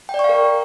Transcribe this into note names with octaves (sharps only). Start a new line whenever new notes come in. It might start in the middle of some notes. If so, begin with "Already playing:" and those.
G5
D5
C#6
F5
A#4